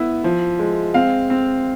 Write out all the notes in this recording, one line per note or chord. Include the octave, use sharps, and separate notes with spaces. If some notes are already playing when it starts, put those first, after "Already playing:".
Already playing: B3 E4 E5
F3
G#3
C4 F5
C4